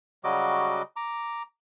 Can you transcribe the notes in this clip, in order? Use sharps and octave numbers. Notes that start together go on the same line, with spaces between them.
C#3 F#3 G3 F#4 D#5 D6
A#5 D6